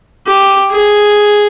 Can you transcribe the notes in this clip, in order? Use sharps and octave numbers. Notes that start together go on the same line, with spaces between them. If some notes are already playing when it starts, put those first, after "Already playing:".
G4
G#4